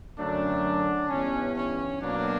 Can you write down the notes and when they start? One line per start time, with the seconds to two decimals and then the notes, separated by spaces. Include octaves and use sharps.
0.19 F#2 D3 F#3 A3 D4
1.09 G2 E3 G3 B3 C#4
1.55 C#4
1.99 B2 F#3 A#3 D4